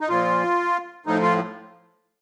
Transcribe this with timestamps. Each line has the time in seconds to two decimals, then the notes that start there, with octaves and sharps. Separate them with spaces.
0.01 D#4
0.09 A#2 F3 F4
1.06 A2 F3 D#4
1.22 F4